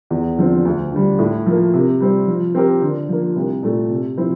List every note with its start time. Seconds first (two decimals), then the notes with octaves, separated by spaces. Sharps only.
0.10 E2
0.38 D3 F3 C4
0.65 D2
0.92 D3 G3
1.19 A2
1.46 F3 A#3
1.74 C3
2.00 G3 C4
2.28 F3
2.55 C4 G4 A#4
2.82 D3
3.09 F3 A#3
3.36 C2
3.63 A#2 A3
3.90 C3
4.18 F3 C4 E4